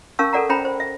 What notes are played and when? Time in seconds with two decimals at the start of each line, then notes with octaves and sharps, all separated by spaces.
0.19 C#4 A#4 F5 A5 C#6 E6
0.33 A4 A#4 D5 F#5 A#5
0.49 C#4 C5 E5 G5 A#5 B5
0.65 C5
0.80 E5